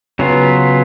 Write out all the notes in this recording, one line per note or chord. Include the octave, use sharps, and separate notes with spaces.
C#3 F#3 B3 F4